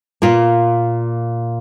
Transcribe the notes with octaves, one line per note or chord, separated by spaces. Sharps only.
A#2 A#3 F4